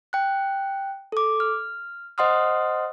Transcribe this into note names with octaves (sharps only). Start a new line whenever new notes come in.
G5 F#6
A4 D6
F6
C5 D#5 F#5 C6 D#6 F6